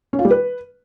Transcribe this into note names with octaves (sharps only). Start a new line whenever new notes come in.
C#4
F4
G3
B4